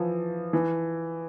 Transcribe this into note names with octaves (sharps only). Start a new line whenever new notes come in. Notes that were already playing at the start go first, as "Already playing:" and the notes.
Already playing: E3 F3
E3